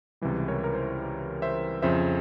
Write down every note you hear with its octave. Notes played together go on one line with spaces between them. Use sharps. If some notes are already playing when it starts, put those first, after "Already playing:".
C#2 C3 E3 G3
A#4 C#5
A#4
C5
C5 E5
F2 C#3 F3 C5 E5